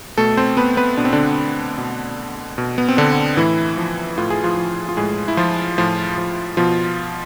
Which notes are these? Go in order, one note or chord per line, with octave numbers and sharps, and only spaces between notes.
B2 A3 A4
C4 C5
B3 B4
B3 B4
B2 D4
C4
D3 D4
B2
B2
B3
C4
D3 D4
A2 E3 E4
F3
A2 F4
G#4
F3 F4
F3
F4
A2 G#3 G#4
E4
F3 F4
A2 F3 F4
F3
B2 F3 F4